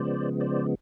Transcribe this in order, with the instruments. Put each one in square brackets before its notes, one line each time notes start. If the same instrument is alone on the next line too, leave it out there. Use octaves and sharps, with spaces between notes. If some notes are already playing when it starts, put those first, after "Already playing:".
Already playing: [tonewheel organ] C#3 F3 G#3 B3 C5 D5
C5 D5